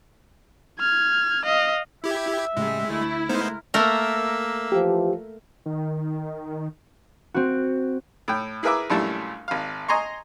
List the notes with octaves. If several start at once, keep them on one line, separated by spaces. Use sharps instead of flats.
F6 G#6
D#5 F5
E4 G4 E5 G#6
A2 C#3 G3 G#3
D2 A3 E4
C#3 G#3 A3 B3 D#4 A#4 C5
A3 A#3 A#4 E5
E3 F3 G4
D#3
C4 F#4
A2 G5
E4 G#4 A#4 B4 E5 D6
A#1 F#2 G3 A3 E4 A5
G#1 F5
D#5 G#5 A#5 C6 C#6